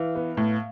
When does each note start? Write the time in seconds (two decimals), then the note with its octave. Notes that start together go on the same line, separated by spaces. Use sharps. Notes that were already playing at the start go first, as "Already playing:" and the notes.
Already playing: E3 F5
0.15 B3
0.37 A2